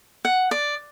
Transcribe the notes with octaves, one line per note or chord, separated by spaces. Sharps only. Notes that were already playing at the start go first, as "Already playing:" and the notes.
F#5
D5